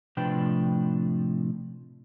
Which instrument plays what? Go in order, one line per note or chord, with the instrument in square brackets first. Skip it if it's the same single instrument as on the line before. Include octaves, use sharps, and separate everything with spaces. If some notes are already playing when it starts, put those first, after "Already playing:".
[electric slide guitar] A2 C3 F3 D4 B4 G5